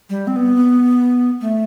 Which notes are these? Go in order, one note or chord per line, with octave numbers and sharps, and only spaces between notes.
G3
C4
B3
A3